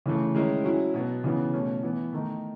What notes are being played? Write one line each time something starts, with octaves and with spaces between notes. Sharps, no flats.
C#3 E3 A3
D#3 G#3 C#4 E4
F#3 C#4 E4
B2 F#3 B3
C#3 E3 B3
B2 A3 C#4
E3 B3 E4
D#3 A3 D#4